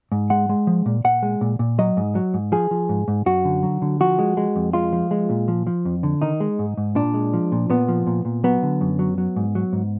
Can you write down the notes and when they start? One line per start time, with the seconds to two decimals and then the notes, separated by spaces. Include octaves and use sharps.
0.12 G#2
0.30 G#3 F#5
0.49 G#3
0.67 F3
0.86 A#2
1.04 A#2 F#5
1.23 G#3
1.41 A#2
1.59 A#2
1.79 F#3 D#5
1.97 G#2
2.15 F#3
2.34 G#2
2.52 F3 G#4
2.71 F3
2.89 G#2
3.08 G#2
3.26 F#2 F#4
3.45 D3
3.63 F#3
3.82 D3
4.00 F3 F#4
4.19 G#3
4.37 G#3
4.56 F2
4.73 G#3 F4
4.93 F3
5.11 G#3
5.30 A#2
5.48 F3
5.67 F3
5.85 F2
6.03 D3
6.22 D#3 D#4
6.40 G#3
6.59 G#2
6.77 G#2
6.95 A#2 D4
7.14 G#3
7.34 F3
7.52 A#2
7.70 A#2 B3
7.88 F3
8.07 A#2
8.25 A#2
8.44 F#3 B3
8.63 D3
8.81 F#2
8.99 F#3
9.18 F#3
9.36 G#2
9.55 F#3
9.73 G#2